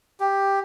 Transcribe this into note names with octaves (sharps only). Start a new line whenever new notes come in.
G4